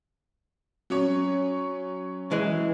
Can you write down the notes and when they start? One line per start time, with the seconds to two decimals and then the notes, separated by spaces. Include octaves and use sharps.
0.90 F#3 C#4 C#5
2.32 E3 G#3